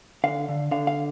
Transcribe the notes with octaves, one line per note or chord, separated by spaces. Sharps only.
D3 F5
D3
D3 F5
F5